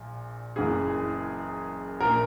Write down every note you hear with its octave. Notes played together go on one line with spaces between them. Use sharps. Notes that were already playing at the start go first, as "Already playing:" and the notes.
Already playing: A#1 A#2
F#1 F#2 E3 G#4
A#1 A#2 A#4